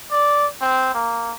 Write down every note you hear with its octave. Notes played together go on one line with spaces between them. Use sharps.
D5
C4
A#3